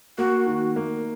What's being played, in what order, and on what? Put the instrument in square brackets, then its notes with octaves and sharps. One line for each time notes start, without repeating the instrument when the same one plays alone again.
[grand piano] A#3 [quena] F#4
[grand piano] D#3
A#3